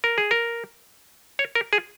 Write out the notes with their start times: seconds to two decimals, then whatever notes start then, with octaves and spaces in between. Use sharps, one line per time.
0.04 A#4
0.18 G#4
0.31 A#4
1.39 C#5
1.55 A#4
1.73 G#4